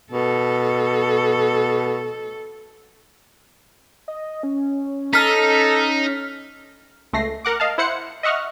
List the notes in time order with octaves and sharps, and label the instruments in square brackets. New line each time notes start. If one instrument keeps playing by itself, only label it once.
[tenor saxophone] B2 [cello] A4
[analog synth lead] D#5
C#4
[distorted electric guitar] D#4 [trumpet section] A4 [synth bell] F6 B6
[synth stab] C#2 A3 A#6 C7
A#4 F#5 D6
D#5 F5 A5
E4 C5 F#5 C#7
D#5 E5 F#5 C#6 F6